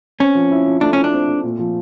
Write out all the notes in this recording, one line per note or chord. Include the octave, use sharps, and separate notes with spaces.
C4 C#4
F3
E4
F3
A3 D4
C#4 E4
D4
C4
A3
A#2
F3